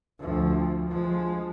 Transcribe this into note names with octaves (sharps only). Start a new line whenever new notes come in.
D2 F3
F3 G#3